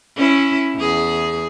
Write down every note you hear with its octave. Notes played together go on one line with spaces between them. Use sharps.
C#4 E4
E2 G#4